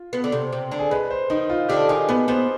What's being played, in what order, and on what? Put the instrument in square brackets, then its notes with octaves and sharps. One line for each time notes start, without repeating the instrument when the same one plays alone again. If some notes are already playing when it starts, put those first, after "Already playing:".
Already playing: [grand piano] F4
[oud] B3
D3
C3
C3
D3
[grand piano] G#4
[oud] G#3 [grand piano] B4
[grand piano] C5
[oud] D#3 [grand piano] D#4
[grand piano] F4
[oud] D3 [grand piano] G4
[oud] D#3 [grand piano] G#4
[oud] B3 [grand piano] B4
[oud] B3 [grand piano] C5